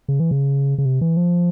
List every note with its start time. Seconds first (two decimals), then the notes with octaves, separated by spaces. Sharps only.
0.08 C#3
0.20 E3
0.31 C#3
0.78 C#3
0.85 C3
1.01 E3
1.17 F3